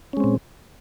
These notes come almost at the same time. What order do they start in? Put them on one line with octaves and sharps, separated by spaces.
C#4 G#3 C4 A#2